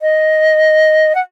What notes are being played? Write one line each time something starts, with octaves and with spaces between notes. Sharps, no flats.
D#5
F#5